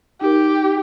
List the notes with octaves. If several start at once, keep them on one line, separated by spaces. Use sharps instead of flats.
D#4 G4 A#4